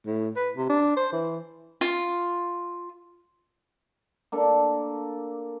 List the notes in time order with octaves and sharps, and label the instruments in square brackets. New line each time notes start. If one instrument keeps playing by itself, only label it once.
[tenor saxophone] A2
B4
C3
D4
C5
E3
[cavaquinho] F4
[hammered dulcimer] A#3 D4 A4